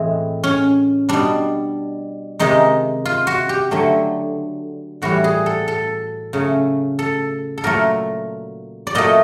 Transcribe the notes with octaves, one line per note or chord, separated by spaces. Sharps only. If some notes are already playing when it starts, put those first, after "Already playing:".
Already playing: A2 E3 G#3 C4
C#4
B2 G3 D4
C3 D#3 G#3 D#4
F4
F#4
G4
D3 F#3 A3
A2 E3 G3 F#4
G#4
A4
A4
C#3 F#3 A3
A4
A4
A#2 F#3 A3 A#4
D5
A#2 F#3 A3 D#5